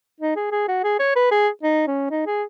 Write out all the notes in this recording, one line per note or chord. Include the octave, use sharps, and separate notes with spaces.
D#4
G#4
G#4
F#4
G#4
C#5
B4
G#4
D#4
C#4
D#4
G#4